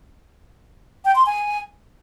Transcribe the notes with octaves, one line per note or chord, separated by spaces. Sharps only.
G5
C6
G#5